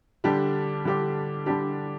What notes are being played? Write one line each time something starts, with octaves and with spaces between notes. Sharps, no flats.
D3 G3 D4 G4
D3 G3 D4 G4
D3 G3 D4 G4